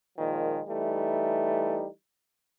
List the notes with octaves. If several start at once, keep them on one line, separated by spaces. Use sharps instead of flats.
A#2 D#3 F3 G#3
E3 G3 A3 D#4